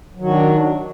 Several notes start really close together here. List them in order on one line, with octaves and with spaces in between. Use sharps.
F#3 D#3 F#4 D4